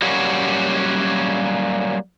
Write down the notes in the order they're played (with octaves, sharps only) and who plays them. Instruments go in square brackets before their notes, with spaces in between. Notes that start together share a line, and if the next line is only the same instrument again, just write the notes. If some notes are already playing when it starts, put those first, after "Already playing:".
[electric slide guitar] F#3 G3 A#3 C#4 F#4